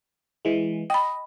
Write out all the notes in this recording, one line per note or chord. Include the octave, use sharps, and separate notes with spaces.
E3 G#3
D#5 G5 B5